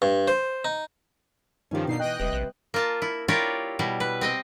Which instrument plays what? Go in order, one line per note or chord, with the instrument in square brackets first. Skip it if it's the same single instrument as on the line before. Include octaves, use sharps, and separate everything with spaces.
[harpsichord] G2
C5
D#4
[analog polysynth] G2 D#3 F3 [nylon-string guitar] C#4 G4
[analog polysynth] B2 D#4 C7 [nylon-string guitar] A#3 C4 D4
[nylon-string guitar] B2 E3 [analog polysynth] D#5 G5 F#6
[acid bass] E1 [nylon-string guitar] C3 G3 B4
[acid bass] A#1
[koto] A#3 F4 A5
E4
E4 F4 G4 A#4 C#5 D5
B2 G3 E4
B4
C4 D#5 G5